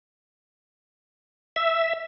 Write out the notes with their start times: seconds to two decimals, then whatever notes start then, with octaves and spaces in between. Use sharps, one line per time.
1.56 E5